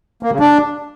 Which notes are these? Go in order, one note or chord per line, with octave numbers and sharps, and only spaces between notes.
A#3
C#3
D4